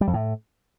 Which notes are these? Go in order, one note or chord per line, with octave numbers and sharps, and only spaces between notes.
G3
F2
A2